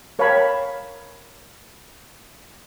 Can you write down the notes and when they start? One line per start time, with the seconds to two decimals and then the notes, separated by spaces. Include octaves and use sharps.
0.19 A#4 C#5 F5 G5 A5 B5